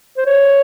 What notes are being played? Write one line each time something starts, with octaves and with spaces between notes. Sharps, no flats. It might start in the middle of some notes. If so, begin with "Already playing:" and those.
C5
C#5